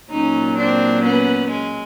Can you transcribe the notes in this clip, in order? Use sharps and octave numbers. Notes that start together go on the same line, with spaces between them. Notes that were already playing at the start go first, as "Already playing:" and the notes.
A#2 F#3 C#4 D#4
C4 D4
B3 C#4
G#3